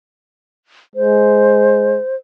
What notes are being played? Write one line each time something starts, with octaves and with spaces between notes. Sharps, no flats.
G#3 C5